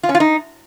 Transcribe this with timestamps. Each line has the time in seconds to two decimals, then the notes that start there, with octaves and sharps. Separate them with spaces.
0.03 F4
0.09 C#4
0.15 F4
0.20 D#4